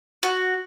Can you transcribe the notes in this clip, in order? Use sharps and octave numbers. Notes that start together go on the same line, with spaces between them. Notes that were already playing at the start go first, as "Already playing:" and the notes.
F#4